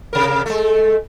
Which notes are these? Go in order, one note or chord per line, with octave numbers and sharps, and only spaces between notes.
C3 A#4
G#3 A3